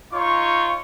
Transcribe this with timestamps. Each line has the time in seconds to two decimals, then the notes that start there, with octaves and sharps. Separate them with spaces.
0.12 D#4 F4 C#5 C#6